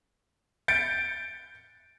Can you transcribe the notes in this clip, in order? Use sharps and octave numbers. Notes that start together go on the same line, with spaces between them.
G6 A6 C#7 D7